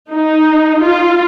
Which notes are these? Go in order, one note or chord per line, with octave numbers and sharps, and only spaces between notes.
D#4
F4